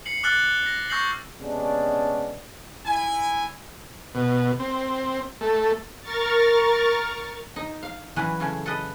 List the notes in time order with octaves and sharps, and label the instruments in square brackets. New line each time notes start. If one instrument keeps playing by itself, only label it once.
[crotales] C7 C#7 F#7
D6 F6 F#6 A6 F#7
A#6
C#6 E6 G6 A#6 C7 F#7
[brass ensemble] C3 G#3 B3 C#4 D4
[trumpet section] E4 G#5
[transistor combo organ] B2
C4
A3
[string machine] A#4 A#5 C#6 F6 A6
[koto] D#4
F5
E3 F#3 G3 C#4 B4
C#3 A3 C#4
A4 B4 D#5